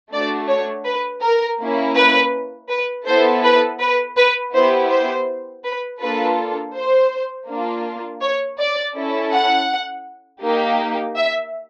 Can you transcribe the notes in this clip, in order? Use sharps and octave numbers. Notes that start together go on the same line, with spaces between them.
A3 D4 F#4 D5
C#5
B4
A#4
A#3 C#4 E4
B4
B4
B3 E4 A4 C5
B4
B4
B4
B3 E4 G4 C5
C5
B4
A#3 D4 F4 A4 B4
C5
A#3 D4 F4
C#5
D5
C#4 E4 A4
F#5
A#3 D#4 G4
E5